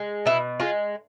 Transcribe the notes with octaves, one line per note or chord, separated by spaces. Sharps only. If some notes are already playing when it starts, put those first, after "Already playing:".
Already playing: G#3
B2 E4
G#3 F4